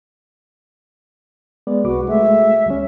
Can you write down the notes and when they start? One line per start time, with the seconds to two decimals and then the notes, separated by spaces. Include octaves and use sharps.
1.67 G#3 B3 D5
1.84 C2 F#4 B4 D6
2.08 G#3 A3 E5
2.66 D2 G3 C#4